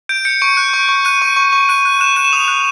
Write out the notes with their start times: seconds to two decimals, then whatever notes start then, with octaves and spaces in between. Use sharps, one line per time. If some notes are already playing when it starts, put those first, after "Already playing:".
0.09 G6 D7
0.25 G6 C#7
0.42 C#6 D7
0.57 F#6
0.74 C#6
0.89 C#6
1.05 F#6 D#7
1.22 C#6
1.36 C#6
1.53 C#6
1.69 F#6 D#7
1.85 F#6
2.00 F#6 E7
2.16 F#6 D#7
2.25 E7
2.32 D#6 F7
2.48 F#6